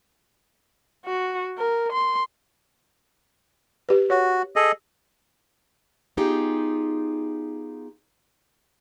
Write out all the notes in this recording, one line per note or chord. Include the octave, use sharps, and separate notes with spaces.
F#4
A#4
C6
G4 B4
F#4 C#5
G#4 A4 D#5
B3 D#4 F4 G4 G#4